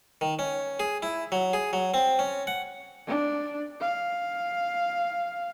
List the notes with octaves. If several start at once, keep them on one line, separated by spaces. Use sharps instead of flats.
D#3
C#4
G#4
E4
F#3
G#4
F#3
C4
C#4
F#5
D4
F5